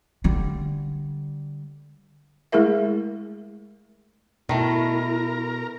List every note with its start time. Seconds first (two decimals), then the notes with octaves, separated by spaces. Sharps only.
0.24 D3 G3
2.52 G#3 A3 E4 G#4 A#4 E5
4.49 B2 D#3 A3 E4 A#4